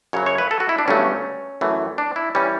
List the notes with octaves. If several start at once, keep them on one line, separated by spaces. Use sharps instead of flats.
F#2 C#3 F#3 C#5
C#5
B4
A4
F#4
E4
D4
G1 G2 F#3 A3 C#4
F#2 E3 A3
D4
E4
E3 G3 C#4